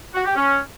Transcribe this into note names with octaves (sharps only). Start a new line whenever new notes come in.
F#4
G4
C#4